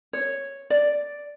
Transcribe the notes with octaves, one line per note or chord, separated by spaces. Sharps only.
C#5
D5